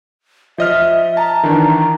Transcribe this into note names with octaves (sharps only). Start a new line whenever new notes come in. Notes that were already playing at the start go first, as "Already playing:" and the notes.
F3 D#5 E5 F6
A5 A#5
D#3 E3 D4